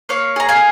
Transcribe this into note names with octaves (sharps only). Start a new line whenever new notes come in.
A#3 C#5 F5
G#4 A#5
F5 G#5